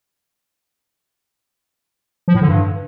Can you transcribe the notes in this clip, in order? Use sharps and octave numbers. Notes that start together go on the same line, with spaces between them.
F3
A2
D3
G2